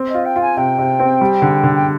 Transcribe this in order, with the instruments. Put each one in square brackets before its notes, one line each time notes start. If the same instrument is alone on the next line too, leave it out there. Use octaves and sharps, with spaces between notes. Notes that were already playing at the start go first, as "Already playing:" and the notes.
Already playing: [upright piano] C4
[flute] D#5
[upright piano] F4
[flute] G5
[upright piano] F4 [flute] G#5
[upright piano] C3 [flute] G5
[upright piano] C3
C4
G3
D3
D3
[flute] G5